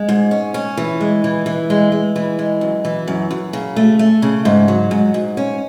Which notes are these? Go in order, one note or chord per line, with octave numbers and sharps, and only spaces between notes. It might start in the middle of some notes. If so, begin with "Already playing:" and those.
Already playing: G#3
G#2
C#4
C#4
E3
G#3
E3
E3
G#3
G#3
E3
G#3
F#2
E3
F#2
F#2
C#3
A3
A3
C#3
G#2
F#3
G#2
G#2
C#4